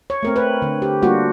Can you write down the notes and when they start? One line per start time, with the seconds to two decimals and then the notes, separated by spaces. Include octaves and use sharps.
0.10 C#5
0.23 A3 C4 A#4
0.36 B4
0.62 D3
0.82 G4
1.02 G3 A#3 D4 F4 F#4